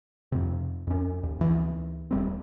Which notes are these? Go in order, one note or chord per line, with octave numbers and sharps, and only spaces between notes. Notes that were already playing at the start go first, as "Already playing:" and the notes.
F2 C3
F2 C#4
D#2
D2 E3
D#1 G3 C4